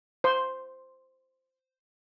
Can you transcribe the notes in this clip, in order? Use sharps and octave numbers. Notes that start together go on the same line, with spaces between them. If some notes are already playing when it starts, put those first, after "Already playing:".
C5 C6